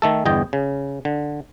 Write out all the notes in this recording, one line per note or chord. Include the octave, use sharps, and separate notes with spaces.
D#3 A3 A4
G1 E2 D#5 G5
C#3
D3